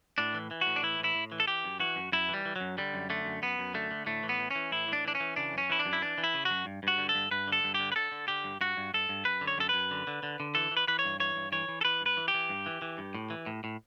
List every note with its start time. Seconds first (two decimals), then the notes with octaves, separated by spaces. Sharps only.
0.18 A2 D4
0.34 E3
0.51 E3
0.61 A2 F#4
0.76 D4
0.83 E3 E4
0.99 A2 E4
1.15 A2
1.32 E3
1.40 A4
1.47 E3 G4
1.64 F#2
1.80 E3 F#4
1.96 F#2
2.12 F#2 E4
2.29 E3 G3
2.45 E3
2.56 F#2 F#3
2.78 D3 G3
2.94 F#2
3.10 D3 A3
3.25 F#2
3.42 F#2 B3
3.59 F#2
3.74 D3 A3
3.91 D3
4.06 A2 A3
4.23 E3
4.29 B3
4.40 E3
4.51 E3 C#4
4.72 A2 E4
4.88 E3 D4
5.05 E3 D4
5.15 C#4
5.20 E3
5.36 C#3 D4
5.53 F#2 C#4
5.70 E3 E4
5.79 D4
5.86 F#2
5.93 E4
6.02 E3 D4
6.18 E3
6.24 E4
6.34 C#3
6.45 F#4
6.50 F#2
6.66 G2
6.83 G2 F#4
6.98 D3
7.09 A4
7.15 G2
7.31 G2 B4
7.48 D3 A4
7.64 G2
7.74 G4
7.80 D3
7.92 B4
7.96 D3 A4
8.12 D3
8.28 D3 G4
8.44 G2
8.61 G2 F#4
8.77 G2
8.94 G2 A4
9.09 G2
9.25 F#2 B4
9.41 D3
9.47 C#5
9.58 F#2 A4
9.69 F#2 B4
9.91 D3
10.07 D3
10.23 D3
10.40 D3
10.55 E3 A4
10.71 E3
10.77 B4
10.88 E3 B4
10.99 C#5
11.05 G2
11.20 E3 C#5
11.36 G2
11.52 E3 C#5
11.68 E3
11.81 A4
11.85 E3 B4
12.01 G2
12.06 B4
12.17 E3
12.28 G4
12.34 E3
12.49 G2
12.66 E3
12.82 E3
12.98 G2
13.14 A2
13.30 E3
13.46 A2
13.64 A2